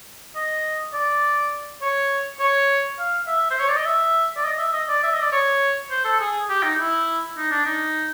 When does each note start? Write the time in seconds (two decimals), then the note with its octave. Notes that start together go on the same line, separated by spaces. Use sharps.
0.36 D#5
0.93 D5
1.81 C#5
2.39 C#5
2.99 F5
3.27 E5
3.51 C5
3.60 C#5
3.68 D5
3.77 D#5
3.86 E5
4.37 D5
4.44 D#5
4.58 E5
4.73 D#5
4.88 D5
5.03 E5
5.13 D#5
5.21 D5
5.32 C#5
5.91 C5
6.05 A4
6.20 G#4
6.49 G4
6.63 D#4
6.78 E4
7.37 D#4
7.51 D4
7.66 D#4